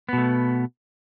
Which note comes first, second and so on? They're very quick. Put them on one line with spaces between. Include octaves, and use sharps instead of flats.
B3 B2 A3